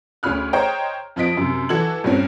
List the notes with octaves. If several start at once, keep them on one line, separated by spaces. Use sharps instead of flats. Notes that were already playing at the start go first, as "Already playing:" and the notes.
D2 C#4 G#4 B5 F6 F#6
G#4 C5 C#5 D#5 G5 A#5
F2 F3 F4 D#5 B6 D7
F#2 C3
E3 F#4 A4 G#6 F#7
G2 A#2 C4 C#4